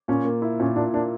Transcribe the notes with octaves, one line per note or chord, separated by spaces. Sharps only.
A#2 C#4
A#3
E4
A#2 C#4
A#2 D4
A#3 D4